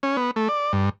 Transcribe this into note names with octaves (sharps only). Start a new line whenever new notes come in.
C#4
B3
A3
D5
G2